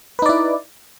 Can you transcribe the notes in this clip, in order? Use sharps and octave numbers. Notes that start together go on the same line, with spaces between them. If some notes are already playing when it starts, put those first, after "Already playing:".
D#4 E4 B4 D5